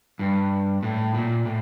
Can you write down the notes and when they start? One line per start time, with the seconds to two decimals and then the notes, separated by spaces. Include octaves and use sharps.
0.19 G2
0.83 A2
1.14 A#2
1.46 A2